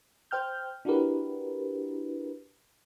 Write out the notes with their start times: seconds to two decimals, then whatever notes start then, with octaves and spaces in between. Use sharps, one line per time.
0.31 C5 G5 F6 G6
0.85 D4 E4 F#4 G4 A#4 B4